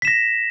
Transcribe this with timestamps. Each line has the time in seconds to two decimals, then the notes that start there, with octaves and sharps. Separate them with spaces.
0.02 B6
0.05 E7
0.08 A#6